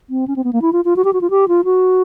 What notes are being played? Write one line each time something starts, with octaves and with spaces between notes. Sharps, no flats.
C4
C#4
C4
B3
A#3
E4
F4
F4
F#4
G4
F#4
F4
G4
F4
F#4